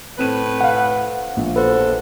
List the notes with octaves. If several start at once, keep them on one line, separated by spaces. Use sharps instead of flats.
A2 C4 B4 D#7
F5 F#5
A#1
E2 F#4 A4 B4 C5